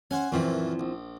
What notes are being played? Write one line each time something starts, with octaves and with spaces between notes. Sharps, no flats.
C#4 C5 F#5 G#5
F#2 A#2 E3 F3 C4 E4
A#1